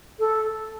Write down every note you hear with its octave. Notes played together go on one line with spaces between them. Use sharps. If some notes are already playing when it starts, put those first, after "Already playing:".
A4